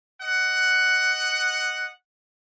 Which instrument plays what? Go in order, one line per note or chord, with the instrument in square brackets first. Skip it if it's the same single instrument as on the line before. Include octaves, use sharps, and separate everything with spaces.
[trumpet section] D#5 F#5